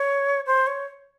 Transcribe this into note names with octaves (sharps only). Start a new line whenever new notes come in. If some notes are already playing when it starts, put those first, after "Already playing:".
Already playing: C#5
C5
C#5